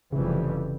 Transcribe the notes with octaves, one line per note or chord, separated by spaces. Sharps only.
F1 F2 C#3 E3 G3